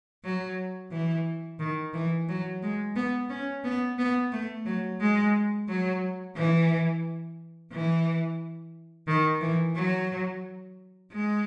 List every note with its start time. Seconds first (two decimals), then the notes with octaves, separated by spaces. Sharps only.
0.24 F#3
0.92 E3
1.59 D#3
1.93 E3
2.29 F#3
2.63 G#3
2.96 B3
3.30 C#4
3.65 B3
3.99 B3
4.33 A3
4.66 F#3
5.01 G#3
5.69 F#3
6.36 E3
7.72 E3
9.08 D#3
9.42 E3
9.76 F#3
11.13 G#3